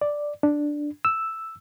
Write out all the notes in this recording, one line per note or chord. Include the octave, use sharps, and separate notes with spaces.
D5
D4
E6